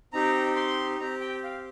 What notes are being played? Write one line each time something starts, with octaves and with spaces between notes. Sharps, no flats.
C4 D#4 G4 A#5
C6
C4 G4 A#5
G5
F5